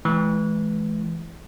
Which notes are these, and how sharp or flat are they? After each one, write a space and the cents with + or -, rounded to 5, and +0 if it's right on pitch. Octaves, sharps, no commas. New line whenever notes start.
E3 +0 G#3 +40